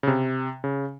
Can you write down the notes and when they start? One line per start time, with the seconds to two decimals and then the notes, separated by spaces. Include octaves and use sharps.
0.03 C#3
0.07 C3
0.64 C#3